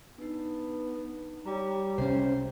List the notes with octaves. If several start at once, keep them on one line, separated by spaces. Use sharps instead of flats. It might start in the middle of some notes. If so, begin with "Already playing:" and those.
B3 D4 D#4
G3 C#5 G5 A#5
C2 C#4 C5